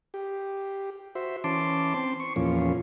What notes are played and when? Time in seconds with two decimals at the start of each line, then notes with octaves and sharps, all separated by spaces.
0.14 G4
1.15 F#4 C5 E5
1.44 E3 C#4 A5 C6 D6
1.94 C4 C6
2.20 C#6
2.36 E2 A#2 F3 C#4